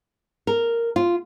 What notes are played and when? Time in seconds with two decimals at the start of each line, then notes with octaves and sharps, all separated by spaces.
0.47 A#4
0.96 F4